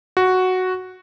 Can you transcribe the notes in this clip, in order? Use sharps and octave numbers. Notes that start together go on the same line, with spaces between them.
F#4